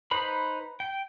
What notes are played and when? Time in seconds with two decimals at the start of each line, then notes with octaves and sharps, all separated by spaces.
0.11 D#4 B4 C5 B5
0.80 G5